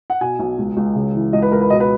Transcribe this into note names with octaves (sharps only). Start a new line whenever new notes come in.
F#5
B2 G#5
B1
C#2
C#2
C#3
E3
C#2 D#5
B4
C#2 A#4
B4
B2 D#5
B4